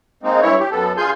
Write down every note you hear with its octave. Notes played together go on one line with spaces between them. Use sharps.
G#3 A#3 C4 D#4
G2 E3 E4 C#5
G4
F#2 B3 A4
G2 F4 G#4 G#5 C6 G6